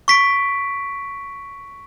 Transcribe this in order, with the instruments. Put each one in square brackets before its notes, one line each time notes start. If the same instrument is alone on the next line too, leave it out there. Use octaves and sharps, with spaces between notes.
[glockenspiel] C#6 B6 D7